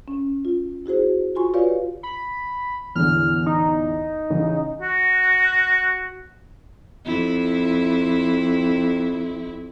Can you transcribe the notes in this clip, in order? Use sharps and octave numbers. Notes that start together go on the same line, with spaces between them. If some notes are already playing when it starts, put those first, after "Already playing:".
C#4
F4
E4 F#4 G#4 C5
F4 F#4 G#5 C6 C#6
F4 G4 B4 C#5 D5 F5
B5
E2 A2 D3 F6
D#4
A1 C#3
F#4
F2 E4